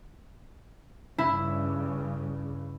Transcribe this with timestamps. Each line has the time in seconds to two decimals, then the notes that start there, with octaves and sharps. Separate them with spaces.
1.18 G2 C#3 E4